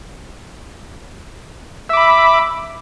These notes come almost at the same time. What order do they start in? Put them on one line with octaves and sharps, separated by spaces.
E5 D6 B5